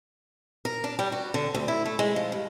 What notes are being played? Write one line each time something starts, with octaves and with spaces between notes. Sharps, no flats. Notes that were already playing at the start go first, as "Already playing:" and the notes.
A#4
D4
G3
F#4
D3
D2
E4
A3
G#3
F3
G2